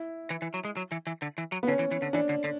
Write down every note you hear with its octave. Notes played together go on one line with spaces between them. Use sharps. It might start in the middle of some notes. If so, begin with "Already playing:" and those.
Already playing: E4
E3
E3
F#3
G#3
F#3
E3
E3
D3
E3
F#3
B3
D3 C#4
E3
E3
D3
E3 D4
D3
D3